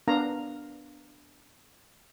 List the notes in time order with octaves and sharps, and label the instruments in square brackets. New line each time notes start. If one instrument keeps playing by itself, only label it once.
[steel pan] B3 D4 A#4 F5 A#5